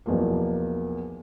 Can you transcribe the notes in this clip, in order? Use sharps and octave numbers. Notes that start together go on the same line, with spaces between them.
B1 E2 F3 A#3